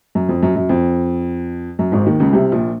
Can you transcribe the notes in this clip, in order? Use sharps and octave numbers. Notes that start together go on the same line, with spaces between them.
F#2
F2
F#2
F#2
F2
F#2
G#1 G#2
D#2 D#3
C#2 C#3
C2 C3
A#1 A#2